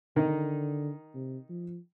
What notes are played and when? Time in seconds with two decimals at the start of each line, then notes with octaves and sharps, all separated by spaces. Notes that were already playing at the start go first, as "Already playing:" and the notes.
0.16 D3 D#3 D#4
1.15 C3
1.49 F3